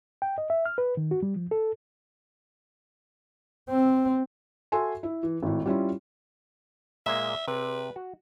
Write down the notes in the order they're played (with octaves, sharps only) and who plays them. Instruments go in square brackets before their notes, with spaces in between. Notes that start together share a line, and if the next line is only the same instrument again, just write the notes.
[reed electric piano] G5
D#5
E5
F6
B4
D#3
F#4
G3
F3
A4
[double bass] C4
[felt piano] F#4 A4 E5 G#5 C6
E4
E3
G#1 A2
G3 C#4 E4 F4
[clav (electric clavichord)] A#2 G#3 A#3 [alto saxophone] E5
[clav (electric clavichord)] C3 [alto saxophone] B4
[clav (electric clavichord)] F#4